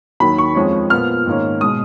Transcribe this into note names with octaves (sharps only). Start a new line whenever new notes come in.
D#2 D#3 F#3 B5
C#6
F2 F3 G#3 C#4
A#2 F3 B3 F6
G#2 D#3 A#3 C#4
B2 G#3 D#6